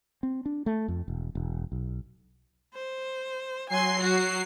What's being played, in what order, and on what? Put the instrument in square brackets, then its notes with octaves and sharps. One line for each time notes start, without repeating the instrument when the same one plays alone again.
[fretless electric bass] C4
D4
A3
F2
E1
E1
B1
[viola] C5
[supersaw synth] F#3 C7 [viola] G#5 C6
[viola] F#4